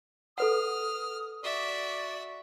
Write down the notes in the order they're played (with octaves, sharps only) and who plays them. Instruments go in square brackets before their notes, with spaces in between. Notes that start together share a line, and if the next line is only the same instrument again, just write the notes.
[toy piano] A4 B4 F#5 [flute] D#6 [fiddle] F6
[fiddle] F#4 E5 [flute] D5